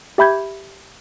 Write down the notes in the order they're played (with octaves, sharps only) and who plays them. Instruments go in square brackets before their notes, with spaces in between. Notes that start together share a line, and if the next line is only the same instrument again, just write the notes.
[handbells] G4 E5 B5 G6 G#6